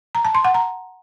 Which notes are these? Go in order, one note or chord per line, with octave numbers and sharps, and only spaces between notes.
A#5
A5
C6
F#5
A#5